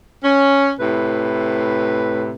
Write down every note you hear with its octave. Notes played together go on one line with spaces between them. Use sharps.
C#4
A2 C3 B4